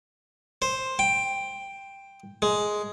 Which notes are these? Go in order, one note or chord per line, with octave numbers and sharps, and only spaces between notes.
C5
G5
G#3